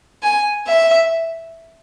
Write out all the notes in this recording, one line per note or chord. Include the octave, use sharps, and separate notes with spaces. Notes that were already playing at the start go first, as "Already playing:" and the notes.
G#5
E5